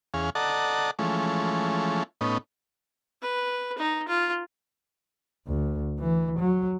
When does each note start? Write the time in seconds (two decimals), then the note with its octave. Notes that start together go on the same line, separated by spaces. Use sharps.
0.14 E2 C#4 G#4 F5
0.35 A4 D5 D#5 F#5 A5 A#5
0.99 E3 F3 G#3 A3 C#4
2.21 A2 B3 C#4 D#4
3.22 B4
3.78 D#4
4.08 F4
5.47 D2
6.00 E3
6.39 F#3